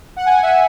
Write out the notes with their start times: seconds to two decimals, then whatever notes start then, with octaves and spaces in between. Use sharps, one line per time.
0.16 F#5
0.26 G#5
0.43 E5